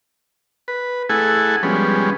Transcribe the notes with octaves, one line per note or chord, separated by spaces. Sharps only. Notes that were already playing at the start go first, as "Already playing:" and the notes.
B4
A3 E4 G#4 A4 F#5 G#5
F3 G3 G#3 B3 C#4